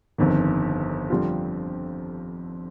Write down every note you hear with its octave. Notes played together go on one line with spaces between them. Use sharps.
G1 F2 D#3
F2 D3 G3 C4 F4